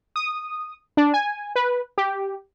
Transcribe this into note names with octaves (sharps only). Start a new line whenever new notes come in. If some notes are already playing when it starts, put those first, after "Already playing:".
D#6
D4
G#5
B4
G4